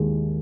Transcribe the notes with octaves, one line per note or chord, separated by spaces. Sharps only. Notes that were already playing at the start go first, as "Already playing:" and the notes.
Already playing: D#2 G#3